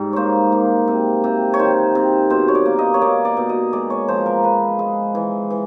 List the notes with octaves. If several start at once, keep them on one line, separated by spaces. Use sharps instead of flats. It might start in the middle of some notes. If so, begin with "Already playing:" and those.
Already playing: G#2 G3
A#3 C5 C#5
A#3
C3
C3
C#5
D#3 C5
C3
B2 C5
C#5
D5
A#3
D#5
C#5
A#3 D5
D5
B2
D#5
G#3 D5
C#5
F3 C5
A#4
F3 B4
G#3
E3
E3